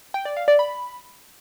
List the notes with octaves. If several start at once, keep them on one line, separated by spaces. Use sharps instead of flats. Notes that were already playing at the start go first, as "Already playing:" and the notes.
G5
D5
F5
D5
B5